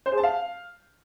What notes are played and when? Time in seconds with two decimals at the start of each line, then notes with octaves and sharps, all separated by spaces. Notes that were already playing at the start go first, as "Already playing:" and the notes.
0.06 C5
0.12 G#4
0.18 A5
0.24 F5